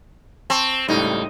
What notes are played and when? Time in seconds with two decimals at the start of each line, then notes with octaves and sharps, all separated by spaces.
0.50 C4 A5 C#6
0.88 C#2 A2 G3 D#4